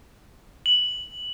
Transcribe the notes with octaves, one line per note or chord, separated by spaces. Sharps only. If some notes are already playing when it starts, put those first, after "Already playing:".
F#7